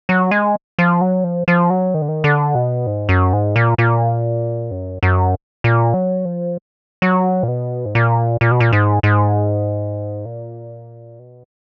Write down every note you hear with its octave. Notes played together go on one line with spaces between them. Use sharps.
F#3
G#3
F3
F#3
F3
F3
F#3
D#3
D3
D#3
D3
B2
G#2
F#2
G#2
A#2
A#2
F#2
F#2
A#2
F#3
F3
F#3
A#2
B2
G#2
A#2
A#2
B2
A#2
G#2
G#2
A#2
B2